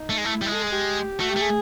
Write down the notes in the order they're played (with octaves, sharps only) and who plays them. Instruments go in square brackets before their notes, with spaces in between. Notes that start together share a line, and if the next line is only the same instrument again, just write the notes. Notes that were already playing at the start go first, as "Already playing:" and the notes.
Already playing: [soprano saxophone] D#4
[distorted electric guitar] A3
G#3
[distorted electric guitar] A3 [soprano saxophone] E4
[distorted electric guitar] G3
G#3
[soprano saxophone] A4
G#4
G4
[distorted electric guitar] A3 [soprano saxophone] F#4
[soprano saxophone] G4
[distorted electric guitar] A3
[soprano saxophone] G#4